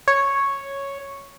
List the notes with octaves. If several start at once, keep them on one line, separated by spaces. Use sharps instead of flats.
C#5